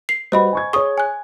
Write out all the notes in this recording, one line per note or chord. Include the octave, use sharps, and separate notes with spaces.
C7
G3 F#4 B4 C5 D#5 B5
G#5 C#6 G#6
G#4 C#5 C#6 D#6
G#5 F#6